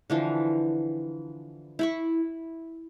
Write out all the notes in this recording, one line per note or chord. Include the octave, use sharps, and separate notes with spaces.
D3 E3 F3
E4 B5 C#6